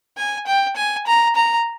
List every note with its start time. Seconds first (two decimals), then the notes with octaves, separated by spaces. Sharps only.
0.17 G#5
0.47 G5
0.76 G#5
1.07 A#5
1.35 A#5